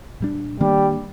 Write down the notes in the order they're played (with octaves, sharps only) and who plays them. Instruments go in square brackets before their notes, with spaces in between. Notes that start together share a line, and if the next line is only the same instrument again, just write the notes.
[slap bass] A#2 G3 D4
[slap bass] D#3 A#3 D4 [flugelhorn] G3